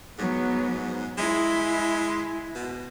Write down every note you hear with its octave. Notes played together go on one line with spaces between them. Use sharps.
G#2 F#3 B3
G#3 E4
B2